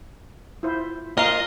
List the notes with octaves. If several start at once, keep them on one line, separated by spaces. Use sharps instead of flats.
E4 F4 C5
A#3 F4 A#4 D#5 F5